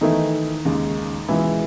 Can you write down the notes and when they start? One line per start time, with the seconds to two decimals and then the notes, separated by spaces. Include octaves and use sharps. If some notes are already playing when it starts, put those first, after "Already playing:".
0.01 D#3 E3 A3 D#4 E4
0.65 D#2 C#3 G#3
1.28 C#2 B2 E3 G#3 B3 E4